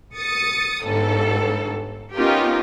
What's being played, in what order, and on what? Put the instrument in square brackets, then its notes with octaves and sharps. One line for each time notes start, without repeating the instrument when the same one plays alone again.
[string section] D#6 A6 C#7
G1 G#2 A4
B3 C#4 D#4 F4 G4 A#4